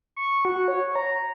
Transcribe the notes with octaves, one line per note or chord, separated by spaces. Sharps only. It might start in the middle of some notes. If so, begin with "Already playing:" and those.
C#6
F#4
C#5
A#5